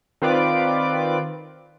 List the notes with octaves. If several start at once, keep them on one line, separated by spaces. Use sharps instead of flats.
D#3 C4 F4 B4 D5 D6